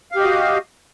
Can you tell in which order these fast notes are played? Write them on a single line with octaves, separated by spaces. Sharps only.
F5 G4 D#5 F#4